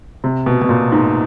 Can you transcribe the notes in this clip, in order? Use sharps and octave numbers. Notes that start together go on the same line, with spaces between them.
C3
B2
B2
A#2
G#2